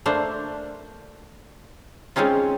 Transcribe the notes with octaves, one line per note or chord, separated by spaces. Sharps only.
A3 A#3 D4 C5
G#3 C4 C#4 D#4 F4